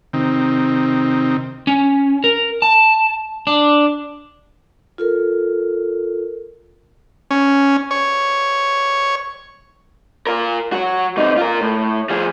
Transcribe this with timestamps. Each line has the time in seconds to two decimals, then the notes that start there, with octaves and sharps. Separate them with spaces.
0.13 C3 D#3 C4 D#4
1.67 C#4
2.24 A#4
2.62 A5
3.47 D4
4.98 F4 A4 A#4
7.31 C#4
7.91 C#5
10.27 F4 A#4
10.72 F#3 F#4
11.17 C3 D#4
11.37 F4 A#4
11.61 A2
12.10 F3 G#4